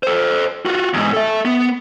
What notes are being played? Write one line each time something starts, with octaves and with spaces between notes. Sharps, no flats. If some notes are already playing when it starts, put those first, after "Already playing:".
A4 C5
F4 F#4
E2 G#2
A4 E5
B3